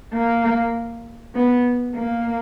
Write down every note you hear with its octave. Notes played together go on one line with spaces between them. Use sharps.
A#3
B3
A#3